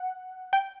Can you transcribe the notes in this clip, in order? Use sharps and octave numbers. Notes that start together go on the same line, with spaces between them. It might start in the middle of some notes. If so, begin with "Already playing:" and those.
Already playing: F#5
G5